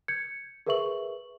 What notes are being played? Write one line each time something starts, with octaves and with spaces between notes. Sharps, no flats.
G6 G#6 C#7
G#4 A#4 B4 E5 C#6 F#7